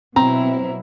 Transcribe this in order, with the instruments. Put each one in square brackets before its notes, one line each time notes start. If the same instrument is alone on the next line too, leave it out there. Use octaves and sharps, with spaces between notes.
[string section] B2 F#3 E4 [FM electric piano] C4 [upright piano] A#5